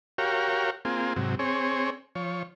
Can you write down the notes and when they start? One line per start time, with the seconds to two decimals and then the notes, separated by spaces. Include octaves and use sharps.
0.18 F#4 G4 A#4 C#5 F5
0.85 A#3 C4 F4 G#4
1.16 G#2 C3 F#3
1.39 C4 G#4 C#5
2.15 F3 C#5